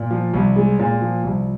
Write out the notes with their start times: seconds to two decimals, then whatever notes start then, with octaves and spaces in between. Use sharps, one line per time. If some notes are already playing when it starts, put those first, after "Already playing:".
Already playing: A#2 D5
0.11 F3
0.33 C2
0.56 G#3
0.79 A#2
1.02 F3
1.24 C2